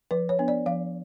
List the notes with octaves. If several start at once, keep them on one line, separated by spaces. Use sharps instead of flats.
F3 B4
C#5
B3 D4
D5
F3 F5